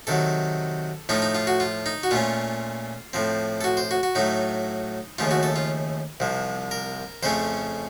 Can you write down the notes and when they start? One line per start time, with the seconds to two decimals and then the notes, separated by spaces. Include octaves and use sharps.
0.07 C3 D#3 F#3 A4
1.09 A2 F3 A3 D#4 F4
1.22 D#4
1.35 F4
1.47 F#4
1.60 F4
1.86 D#4
2.03 F#4
2.11 A#2 A3 C#4 F4
3.13 A2 F3 C4
3.61 A4
3.64 F#4
3.77 C5
3.91 F#4
4.03 F#4
4.15 A2 F#3 A3 D#4
5.19 D#2 C#3 F3 A3 F4
5.31 F#4
5.43 A4
5.56 F4
6.20 C2 C3 F3
6.71 A#4
7.23 F2 C#3 A3 C#4 C5